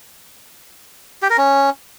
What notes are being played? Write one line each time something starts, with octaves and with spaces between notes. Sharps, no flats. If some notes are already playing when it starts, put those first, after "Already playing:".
G4
A#4
C#4